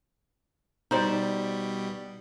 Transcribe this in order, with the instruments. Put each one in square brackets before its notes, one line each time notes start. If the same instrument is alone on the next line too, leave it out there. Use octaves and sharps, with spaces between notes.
[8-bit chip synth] B2 G3 [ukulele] D#4 C5 D5